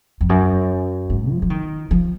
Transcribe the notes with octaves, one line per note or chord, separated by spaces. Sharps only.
F2
F#2
G#2
F3
F3
D#3
F3